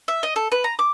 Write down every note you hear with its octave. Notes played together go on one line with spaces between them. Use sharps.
E5
D#5
A4
B4
A#5
D6